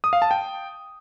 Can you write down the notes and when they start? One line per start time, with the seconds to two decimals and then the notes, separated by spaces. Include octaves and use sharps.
0.04 D#6
0.13 F5
0.22 A5
0.31 G5